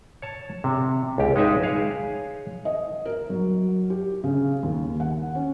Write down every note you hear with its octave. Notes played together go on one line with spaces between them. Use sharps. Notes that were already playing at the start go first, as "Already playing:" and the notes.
C#5 A5
C3
C#2 G4
G#3 D#4 G4 B4 E5
G#4 C#5 F5
D#5
A#4
F#3
G4
C#3
D#2
F#5
C#4